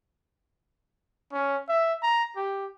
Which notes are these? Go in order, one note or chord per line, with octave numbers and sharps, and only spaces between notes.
C#4
E5
A#5
G4